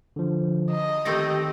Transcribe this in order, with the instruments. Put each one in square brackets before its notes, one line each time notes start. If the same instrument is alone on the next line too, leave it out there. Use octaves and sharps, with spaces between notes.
[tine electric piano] D3 F3
[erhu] D#5
[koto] D#3 A3 C4 [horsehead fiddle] G4 [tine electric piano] A#6